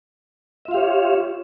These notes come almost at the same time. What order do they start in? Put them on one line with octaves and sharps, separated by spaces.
E5 F4 F5 G4 C#5